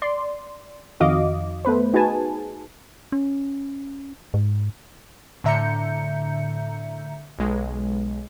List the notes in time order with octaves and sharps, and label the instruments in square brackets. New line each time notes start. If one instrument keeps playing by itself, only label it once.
[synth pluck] D5 C6
F2 D#3 F#4 D#5 F5 D6
A3 B3 B4 C5
D#4 F#4 G#4 B4 G#5 A5
[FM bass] C#4
G#2
[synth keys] A2 D3 E5 A#5 G6 C#7
B1 G#3